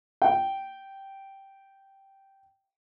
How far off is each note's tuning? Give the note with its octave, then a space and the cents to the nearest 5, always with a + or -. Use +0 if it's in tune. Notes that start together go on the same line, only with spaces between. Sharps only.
G5 -10